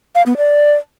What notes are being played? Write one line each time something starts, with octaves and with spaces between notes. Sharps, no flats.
F5
B3
D5